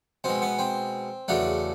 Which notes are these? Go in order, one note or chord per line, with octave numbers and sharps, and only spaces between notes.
B2 G#3 C4
B3
C4
E2 C#3 F#3 A3 D4